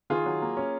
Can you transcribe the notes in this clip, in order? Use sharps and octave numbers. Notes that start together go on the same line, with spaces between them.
D#3 F4 G#4
F#3
A#3
C#4